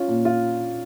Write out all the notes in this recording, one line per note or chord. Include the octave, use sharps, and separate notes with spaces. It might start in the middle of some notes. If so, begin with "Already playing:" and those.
Already playing: C#4 F4
A#2
F4